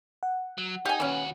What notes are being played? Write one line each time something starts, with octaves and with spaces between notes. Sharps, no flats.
F#5
F#3
D#4 G4 G#5
D#2 E3 C#4 F#4